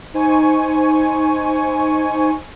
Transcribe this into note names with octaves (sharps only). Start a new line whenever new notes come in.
D#4 C5 G#5 C#6